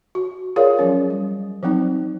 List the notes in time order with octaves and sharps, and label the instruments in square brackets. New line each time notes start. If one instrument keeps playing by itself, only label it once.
[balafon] F#4
F4 G#4 A#4 C#5 D5 F5
F3 F#3 C#4 C#5
G3
F3 F#3 C4 D#4